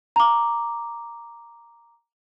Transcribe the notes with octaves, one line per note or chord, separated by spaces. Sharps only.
A#5 D6